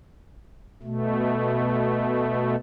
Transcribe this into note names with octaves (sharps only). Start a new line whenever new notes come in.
B2 A3